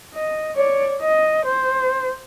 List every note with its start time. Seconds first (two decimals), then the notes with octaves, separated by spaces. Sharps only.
0.15 D#5
0.56 C#5 D5
1.02 D#5
1.46 C5